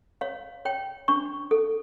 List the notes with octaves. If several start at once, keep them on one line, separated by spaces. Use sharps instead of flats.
C#5 F5
C#5 G5
D4 C#6
A4